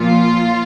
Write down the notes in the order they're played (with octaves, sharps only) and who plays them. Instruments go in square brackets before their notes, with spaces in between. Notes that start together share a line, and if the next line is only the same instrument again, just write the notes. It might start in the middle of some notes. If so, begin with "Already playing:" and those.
Already playing: [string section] A#2 F3 F4